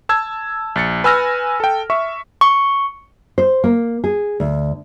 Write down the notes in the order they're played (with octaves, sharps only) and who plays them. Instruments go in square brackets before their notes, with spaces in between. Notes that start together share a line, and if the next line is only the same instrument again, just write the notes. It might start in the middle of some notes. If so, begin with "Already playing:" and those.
[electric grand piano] A5 E6 G#6
A#1 A6 C#7
B4 G#5 E6 F6 A#6
A4 G5
E5 C#6
[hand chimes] C#6
[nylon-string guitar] C5
A#3
G#4
D2